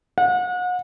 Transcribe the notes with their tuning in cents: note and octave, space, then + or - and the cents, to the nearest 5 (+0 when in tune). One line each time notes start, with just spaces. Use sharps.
F#5 -35